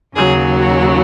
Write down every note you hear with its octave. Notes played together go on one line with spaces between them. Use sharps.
D#2 C#3 F#3 G#4
F#4